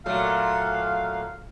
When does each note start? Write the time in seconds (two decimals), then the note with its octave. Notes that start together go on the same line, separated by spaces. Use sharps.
0.06 A#2 F#3 A3 F5